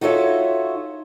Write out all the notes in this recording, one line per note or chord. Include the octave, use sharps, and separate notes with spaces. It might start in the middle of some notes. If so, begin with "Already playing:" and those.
D#4 F4 F#4 A4 C#5 E5